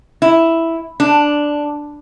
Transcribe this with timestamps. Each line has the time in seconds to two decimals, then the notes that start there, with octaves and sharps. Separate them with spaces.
0.22 E4
1.00 D4